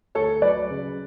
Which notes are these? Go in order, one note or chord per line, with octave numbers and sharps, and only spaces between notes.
D2 A4 C#5
F#3 B4 D5
C#3